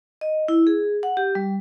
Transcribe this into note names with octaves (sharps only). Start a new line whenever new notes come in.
D#5
E4
G#4
F#5
G4
G3